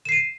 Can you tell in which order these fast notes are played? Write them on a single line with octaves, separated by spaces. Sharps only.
E7 C7 D#7